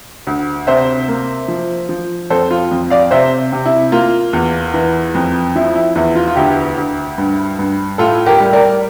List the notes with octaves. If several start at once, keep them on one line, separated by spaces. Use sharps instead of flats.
D2
C3 C5 E5
A#3
F3
F3
F2 A4 C5
F4
F2
D5 F5
C3 C5 E5
C3
E4
A#3 F4
E2
E3
F2
F3 E4
E4
E2 E4
F4
F4
D2 E4 G4
D2
G2
G2
A2 F4 A4
G4 A#4
G3
A#4 D5